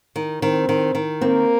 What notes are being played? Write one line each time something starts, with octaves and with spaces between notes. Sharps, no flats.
D#3
D#3 C4
D#3
D#3
A#3 C4